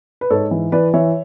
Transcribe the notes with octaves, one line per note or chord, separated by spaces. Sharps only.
B4
G#2 A4 C#5
E3
E3 B4 D5
E3 C#5 E5